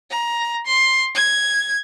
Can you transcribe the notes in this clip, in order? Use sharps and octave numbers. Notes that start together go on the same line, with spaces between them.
A#5
C6
G#6